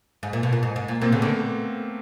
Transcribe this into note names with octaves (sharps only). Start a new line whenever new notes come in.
G#2
A#2
B2
A#2
G#2
G#2
A#2
A#2 A#3 C4
C#3 A3 B3
D3 A#3